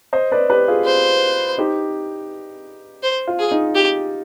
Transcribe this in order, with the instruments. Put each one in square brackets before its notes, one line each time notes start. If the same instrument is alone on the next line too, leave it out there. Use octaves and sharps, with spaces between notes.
[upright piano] C5 D#5
B4 D5
G4 B4
F4 G#4
[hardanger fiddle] C5
[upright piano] D#4 G4
[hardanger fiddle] C5
[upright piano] F4
[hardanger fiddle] G#4
[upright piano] D#4
[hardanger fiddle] G4